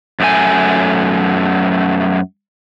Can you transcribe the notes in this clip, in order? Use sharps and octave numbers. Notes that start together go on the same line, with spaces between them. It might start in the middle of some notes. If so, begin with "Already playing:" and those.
F#2 A3 G#5